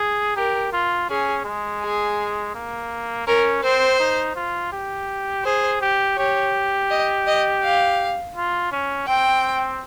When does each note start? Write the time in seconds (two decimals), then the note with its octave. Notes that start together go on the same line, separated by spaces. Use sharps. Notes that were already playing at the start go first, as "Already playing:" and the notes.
Already playing: G#4
0.36 G4 A#4
0.72 F4
1.09 C#4 G#4
1.45 G#3
1.81 G#4
2.55 A#3
3.27 C#4 A#4
3.63 C4 C5
4.00 D#4
4.36 F4
4.72 G4
5.44 G#4 C5
5.81 G4
6.17 G4 C#5
6.91 D#5
7.27 D#5
7.64 F5
8.36 F4
8.72 C#4
9.08 C4 G5